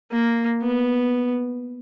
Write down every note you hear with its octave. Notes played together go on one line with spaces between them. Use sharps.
A#3
B3